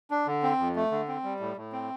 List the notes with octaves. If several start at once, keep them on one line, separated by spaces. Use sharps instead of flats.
D4
D3
C4
F2
A3
D3
C4
G3
A2
A2
C4